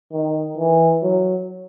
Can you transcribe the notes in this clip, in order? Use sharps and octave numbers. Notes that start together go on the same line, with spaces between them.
D#3
E3
F#3